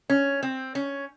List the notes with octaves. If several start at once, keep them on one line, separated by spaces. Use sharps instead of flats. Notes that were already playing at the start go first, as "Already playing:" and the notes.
C#4
C4
C#4